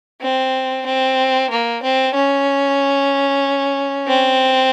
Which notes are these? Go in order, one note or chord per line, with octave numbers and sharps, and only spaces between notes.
C4
C4
A#3
C4
C#4
C4